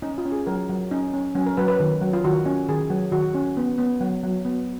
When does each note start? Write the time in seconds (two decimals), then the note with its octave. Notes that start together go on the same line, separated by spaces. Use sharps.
0.02 C#4 D#4
0.18 F4
0.25 C#4
0.32 G#4
0.47 F#3 A#4
0.69 F#3
0.91 C#4 D#4
1.14 C#4
1.35 F#3 C#4
1.46 A#4
1.57 F#3 B4
1.68 B4
1.80 D#3
2.01 F#3
2.13 F4
2.24 D#3 F#4
2.46 C#4
2.69 D#3 G#4
2.90 F#3
3.12 D#3 F#4
3.34 C#4
3.57 B3
3.78 B3
4.01 F#3
4.23 F#3
4.45 B3